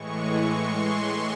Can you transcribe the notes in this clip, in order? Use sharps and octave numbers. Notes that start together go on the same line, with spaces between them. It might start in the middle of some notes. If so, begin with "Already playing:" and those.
Already playing: A2 E3 G#3 C#6
C#6
C6